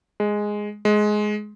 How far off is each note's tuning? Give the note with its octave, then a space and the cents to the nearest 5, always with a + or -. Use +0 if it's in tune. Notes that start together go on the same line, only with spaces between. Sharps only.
G#3 +0
G#3 +15